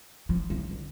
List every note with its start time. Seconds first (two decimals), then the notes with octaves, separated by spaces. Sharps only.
0.29 F3
0.50 F3
0.71 D3